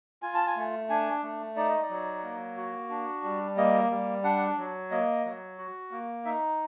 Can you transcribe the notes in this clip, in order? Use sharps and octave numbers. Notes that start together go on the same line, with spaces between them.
F4 G#5
A5
G#5
A3
D4 G#5
A3
D#4 D5
D#5
D5
F#3
A#3
F#4
D4
G3
A#3 D#5
G3
D4 F#5
F#3
A#3 D#5
F#3
F#4
A#3
D#4 E5